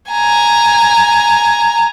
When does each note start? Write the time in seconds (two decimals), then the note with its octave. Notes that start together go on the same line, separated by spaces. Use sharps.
0.12 G#5 A#5